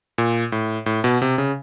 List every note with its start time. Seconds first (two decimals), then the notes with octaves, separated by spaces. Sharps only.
0.18 A#2
0.52 A2
0.86 A2
1.04 B2
1.22 C3
1.38 C#3